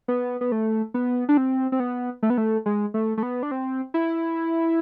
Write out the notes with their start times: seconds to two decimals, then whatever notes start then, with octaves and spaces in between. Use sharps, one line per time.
0.08 B3
0.41 B3
0.52 A3
0.94 B3
1.29 D4
1.37 C4
1.72 C4
1.80 B3
2.23 A3
2.30 B3
2.38 A3
2.66 G#3
2.94 A3
3.17 A3
3.23 B3
3.43 D4
3.51 C4
3.94 E4